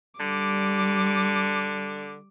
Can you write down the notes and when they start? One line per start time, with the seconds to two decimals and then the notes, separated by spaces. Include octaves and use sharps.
0.20 D3 G3 D6